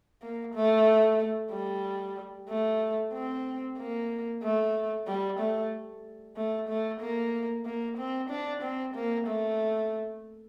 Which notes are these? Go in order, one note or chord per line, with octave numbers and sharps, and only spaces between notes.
A#3
A3
G3
A3
C4
A#3
A3
G3
A3
A3
A3
A#3
A#3
C4
D4
C4
A#3
A3